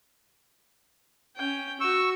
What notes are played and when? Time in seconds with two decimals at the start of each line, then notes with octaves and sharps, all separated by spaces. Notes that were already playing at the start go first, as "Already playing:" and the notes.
1.36 C#4 G5
1.81 F#4 C#6 E6